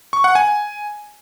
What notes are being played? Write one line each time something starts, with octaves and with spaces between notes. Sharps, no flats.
C#6
F#5
G#5